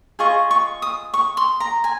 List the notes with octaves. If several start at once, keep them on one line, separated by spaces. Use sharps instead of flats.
F4 G#4 D#5 C#6
C#6
D#6
C#6
C6
A#5
G#5